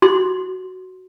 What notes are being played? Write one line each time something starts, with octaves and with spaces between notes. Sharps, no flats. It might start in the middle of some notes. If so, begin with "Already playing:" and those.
F#4 C6